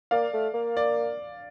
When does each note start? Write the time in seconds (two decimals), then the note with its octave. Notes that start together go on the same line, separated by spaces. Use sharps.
0.11 A#3 D5 F5
0.33 A3
0.54 A#3
0.77 D5